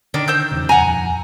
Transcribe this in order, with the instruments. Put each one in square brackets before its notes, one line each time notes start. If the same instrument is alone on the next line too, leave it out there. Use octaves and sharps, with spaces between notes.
[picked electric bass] D3 [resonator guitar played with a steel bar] D#3 [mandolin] D4
[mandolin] C5 E6 G6
[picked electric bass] E2 C#3
[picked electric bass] D#1 F2 [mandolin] F#5 A#5 [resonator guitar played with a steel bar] G#5